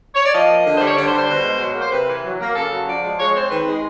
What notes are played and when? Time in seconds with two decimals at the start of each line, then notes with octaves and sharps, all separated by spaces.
0.15 C#5
0.24 D5
0.33 F3 D#5
0.49 A#3
0.64 D3
0.76 G3 C5
0.86 C#5
0.96 D3 D5
1.07 C5
1.12 G3
1.17 C5
1.28 B2
1.43 G#3
1.60 F#3
1.76 A#3
1.81 C5
1.91 C3 B4
2.07 E3
2.24 F#3
2.39 A#3
2.55 C#3 A4
2.71 F#3
2.87 F3 D5
3.02 G#3
3.18 G#3 C#5
3.34 C4 C5
3.50 D#3 B4
3.67 G#3